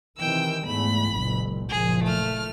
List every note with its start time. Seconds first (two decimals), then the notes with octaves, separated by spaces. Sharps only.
0.18 C3 D#3 E3 G5 E6
0.66 E2 G#2 A3 B5
1.11 F#1 C#2 A#2
1.70 F#1 A#2 F3 G#4
2.04 A3 F6